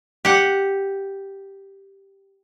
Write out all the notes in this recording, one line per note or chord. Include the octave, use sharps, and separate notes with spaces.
G4 F#5